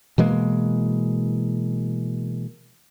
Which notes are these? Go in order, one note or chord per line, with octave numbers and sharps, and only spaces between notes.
B2 E3 G#3 A#3